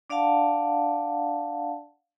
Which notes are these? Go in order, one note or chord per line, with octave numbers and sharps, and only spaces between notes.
D4 D5 F5 F#5 A5